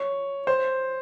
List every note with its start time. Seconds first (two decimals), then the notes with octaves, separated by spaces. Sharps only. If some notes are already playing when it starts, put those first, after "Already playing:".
Already playing: C#5
0.47 C5